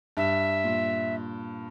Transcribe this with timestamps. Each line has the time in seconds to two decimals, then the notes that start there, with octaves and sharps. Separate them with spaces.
0.17 G2 E5
0.64 A#2